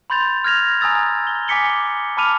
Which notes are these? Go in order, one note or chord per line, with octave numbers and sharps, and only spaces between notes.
B5 C6 G6 A6 F7
F6 G#6 A#6 F7
G#5 A#5 D#6 E6 A6 F7
G7
G#5 D6 B6 C#7 G7
A5 B5 D6 F6 D#7 F7